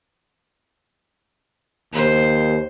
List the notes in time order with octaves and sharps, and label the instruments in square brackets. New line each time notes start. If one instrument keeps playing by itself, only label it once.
[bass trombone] D#2 [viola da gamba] C5